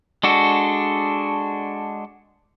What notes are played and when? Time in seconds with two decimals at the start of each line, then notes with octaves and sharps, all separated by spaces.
0.23 G#3 D4 F#4 A4